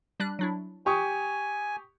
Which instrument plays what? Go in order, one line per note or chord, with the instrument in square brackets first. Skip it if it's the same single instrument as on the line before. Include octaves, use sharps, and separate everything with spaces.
[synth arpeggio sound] G3 D4 F#6
F#3 D4 E4
[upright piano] G4 C#6 D#6 [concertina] G#5